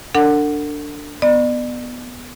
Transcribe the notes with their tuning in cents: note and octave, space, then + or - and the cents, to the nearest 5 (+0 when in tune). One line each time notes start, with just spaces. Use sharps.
D4 +0 A4 +40 F#5 +0
B3 +0 D5 +40